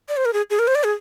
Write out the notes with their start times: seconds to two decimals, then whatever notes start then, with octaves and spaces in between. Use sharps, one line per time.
0.09 D5
0.17 C5
0.25 A#4
0.33 G#4
0.50 G#4
0.59 A#4
0.67 C5
0.75 D5
0.84 G#4